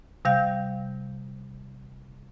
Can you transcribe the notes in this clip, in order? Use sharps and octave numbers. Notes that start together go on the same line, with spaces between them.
C3 G3 F5 G6